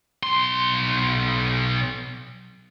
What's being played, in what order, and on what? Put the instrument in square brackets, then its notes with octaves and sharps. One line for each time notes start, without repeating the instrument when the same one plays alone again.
[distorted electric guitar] B1 C6